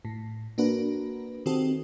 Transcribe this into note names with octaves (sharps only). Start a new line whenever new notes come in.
A2
A#3 D4 F#4 A#4 B4
D#3 C4 D#4 F#4 G4 A4